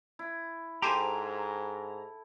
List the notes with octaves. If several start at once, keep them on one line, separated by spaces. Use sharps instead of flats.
E4
G#2 G4 A4 C5 G#5 A#5